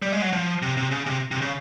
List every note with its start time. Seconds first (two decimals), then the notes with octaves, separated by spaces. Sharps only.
0.02 G3
0.12 G#3
0.22 F#3
0.33 F3
0.62 C3
0.77 C3
0.91 C#3
1.06 C3
1.31 C3
1.42 C#3